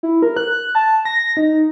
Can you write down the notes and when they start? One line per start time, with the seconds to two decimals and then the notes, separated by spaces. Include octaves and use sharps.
0.03 E4
0.22 A#4
0.37 F#6
0.75 A5
1.05 A#6
1.37 D#4